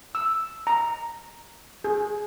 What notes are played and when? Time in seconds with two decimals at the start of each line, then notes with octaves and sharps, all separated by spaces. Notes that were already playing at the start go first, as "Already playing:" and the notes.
0.15 E6
0.67 A#5
1.84 G#4